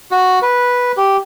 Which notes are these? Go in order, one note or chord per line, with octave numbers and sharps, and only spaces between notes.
F#4
B4
G4